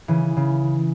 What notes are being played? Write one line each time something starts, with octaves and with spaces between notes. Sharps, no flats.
C#3 E3
C#3